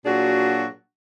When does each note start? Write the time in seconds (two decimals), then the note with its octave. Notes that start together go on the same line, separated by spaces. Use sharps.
0.06 A#2 F#3 D4 F#4 G#4